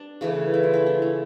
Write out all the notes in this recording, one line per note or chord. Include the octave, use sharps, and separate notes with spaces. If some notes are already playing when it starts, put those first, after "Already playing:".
Already playing: G3 D4
C#3 E3 A3
E4
F4
C#4 E4
D4
C#4